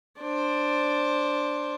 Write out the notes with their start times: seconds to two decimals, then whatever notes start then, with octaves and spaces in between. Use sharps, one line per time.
0.21 D4 C5